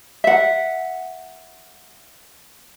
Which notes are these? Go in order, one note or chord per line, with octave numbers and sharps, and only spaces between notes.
E5 F#5